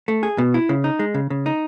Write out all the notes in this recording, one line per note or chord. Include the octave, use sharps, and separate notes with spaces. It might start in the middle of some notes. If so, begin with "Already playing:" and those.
A3
G#4
B2
E4
C#3
D#4
G#3
C#3
C#3
D#4